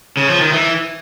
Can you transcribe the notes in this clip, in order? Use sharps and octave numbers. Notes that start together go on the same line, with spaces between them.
C#3
F3
D#3
E3